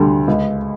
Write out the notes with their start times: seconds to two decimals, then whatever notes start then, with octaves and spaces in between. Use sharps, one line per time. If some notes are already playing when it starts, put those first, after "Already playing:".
Already playing: D2 D3 G3
0.27 C#2